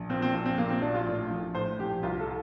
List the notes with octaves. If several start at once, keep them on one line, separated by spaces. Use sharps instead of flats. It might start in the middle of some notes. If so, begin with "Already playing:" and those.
Already playing: A#1
A#2 C4
C4
A#1
C4
A#2 A#3
C4
A#1 D4
F4
A2
A#1
A2 C5
A#1 G4
C2 F4
A4